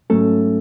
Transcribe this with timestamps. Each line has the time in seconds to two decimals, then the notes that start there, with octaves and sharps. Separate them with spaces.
0.10 G#2 F#3 A3 C#4 A4